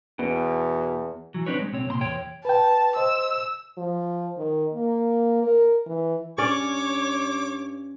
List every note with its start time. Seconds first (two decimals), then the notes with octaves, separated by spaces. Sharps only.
0.19 E2 B2
1.35 E3 F#3
1.46 C4 D4 D#4 B4 C#5
1.61 G#3
1.73 B1 C4 C#5
1.87 C2 A#2 A#5 C6
2.01 E2 E3 C#5 G5
2.45 B4 G5 A5
2.96 C5 D#5 E6
3.77 F3
4.38 D#3
4.73 A#3
5.43 A#4
5.86 E3
6.38 G2 C#4 C#5 D5 D6